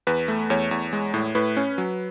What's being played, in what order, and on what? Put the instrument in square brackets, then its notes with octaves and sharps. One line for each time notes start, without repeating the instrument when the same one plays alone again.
[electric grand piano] E2 B4
A3
E2 C#5
E2
G#3
A2
A2 B4
C#4
F#3